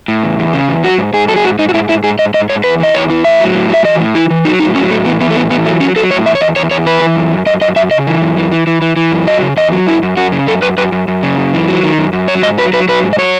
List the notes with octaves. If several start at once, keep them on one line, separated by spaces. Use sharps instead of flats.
A2
E2
E2
C#3
E2
F#3 F#4
G#2
G#2 G#4
F#3 A4
G#4
G#2 F#4
G#2 D#4
F#4
G#2 E4
G#2 E4
G#2 G#4
G#2 D#5
G#2 D#5
G#2 C#5
E2 B4
E3 D#5
E2 C#5
E3
A2 E5
F#3
A2
F#3 E5
E3 D#5
A2
E3 E4
E3
F#3 D#4
A2 D#4
F#3 C#4
A2 A3
E3 B3
E3 B3
A3
A2 B3
E3 B3
F#3 A3
F#3 C#4
F#3 A4
A2 C#5
E2 E5
C#5
E2 D#5
E2 C#5
E2 C#5
E3 B4
E3
F#2
F#2
F#2 D#5
F#2 D#5
F#2 E5
C#3 D#5
E3
F#2
E3
E3
E3
E3
E3
F#2
F#3 D#5
C#3
E2 D#5
F#3
F#2 E4
F#2
F#2 F#4
C#3
F#2 A4
F#2 B4
F#2 B4
F#2
F#2
C#3
F#2
E3
F#3
D#3
F#2
F#2
F#3 C#5
G#2 D#5
F#3 B4
F#3 B4
F#3 B4
G#2
D#5
F#3 C#5